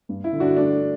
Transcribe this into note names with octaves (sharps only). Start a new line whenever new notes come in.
G2
E4
D3
D4 F#4
A3 D4